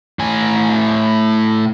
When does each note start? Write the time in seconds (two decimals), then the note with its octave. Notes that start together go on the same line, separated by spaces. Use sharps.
0.19 A2 G#5